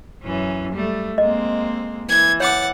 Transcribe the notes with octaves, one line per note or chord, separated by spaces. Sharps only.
F#2 E3 C#4
G3 A3
G#3 A#3 C4 D#5
E3 G#6
C#5 F#5 D6 A6